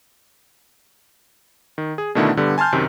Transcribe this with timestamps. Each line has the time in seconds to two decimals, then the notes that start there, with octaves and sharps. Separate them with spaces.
1.78 D#3
1.98 G#4
2.15 B2 D3 D#3 A3 D4 E4
2.37 G2 D3 G3 B3
2.58 G#5 A5 C6 F6 G6
2.72 F#2 C3 D#3